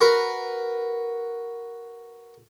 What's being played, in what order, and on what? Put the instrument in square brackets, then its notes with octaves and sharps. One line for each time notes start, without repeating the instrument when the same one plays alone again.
[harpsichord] F#4 A#4 B4